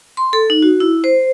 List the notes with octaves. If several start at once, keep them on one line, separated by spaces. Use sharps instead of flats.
C6
A4
D#4
F#4
E4
C5